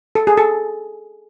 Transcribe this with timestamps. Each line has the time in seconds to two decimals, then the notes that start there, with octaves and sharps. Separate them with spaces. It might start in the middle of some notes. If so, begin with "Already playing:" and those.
0.15 A4
0.27 G#4
0.37 A4